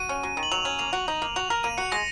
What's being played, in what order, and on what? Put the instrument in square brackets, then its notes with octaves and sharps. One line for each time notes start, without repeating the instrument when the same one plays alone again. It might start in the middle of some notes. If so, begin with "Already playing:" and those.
Already playing: [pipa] F#4 [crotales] D#7
[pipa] C#4
F#3
D#3
[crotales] F#7
[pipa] F#3 [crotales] F7
[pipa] C#4
[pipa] A#3 [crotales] F7
[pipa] F#4
D#4
A#3
[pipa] F#4 [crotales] F7
[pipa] A#4
[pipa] A#3 [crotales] D#7
[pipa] F#4 [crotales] C#7
[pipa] G#3 [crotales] A#6